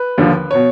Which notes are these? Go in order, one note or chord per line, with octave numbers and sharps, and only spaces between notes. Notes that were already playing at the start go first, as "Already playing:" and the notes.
Already playing: B4
D#2 D3 F3
B2 C#5